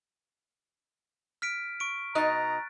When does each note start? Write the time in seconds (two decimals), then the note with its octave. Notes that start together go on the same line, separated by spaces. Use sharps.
1.42 F6 B6 D7
1.80 C#6 D7
2.15 B2 D#4 D#5 A#5 F#6 A6